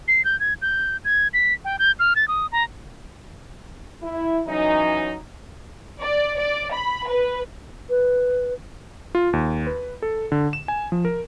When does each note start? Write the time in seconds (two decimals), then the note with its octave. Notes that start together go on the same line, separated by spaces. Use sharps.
0.08 C7
0.25 G6
0.40 G#6
0.62 G6
1.05 G#6
1.33 B6
1.65 G5
1.79 G6
1.99 F6
2.16 A6
2.28 D#6
2.52 A#5
4.03 E4
4.47 E3 F#3 C#4 D#4
6.01 D5
6.38 D5
6.72 B5
7.08 B4
7.90 B4
9.15 F4
9.33 D#2
9.67 B4
10.02 A4
10.32 D3
10.53 E7
10.68 G#5
10.92 F3
11.05 A#4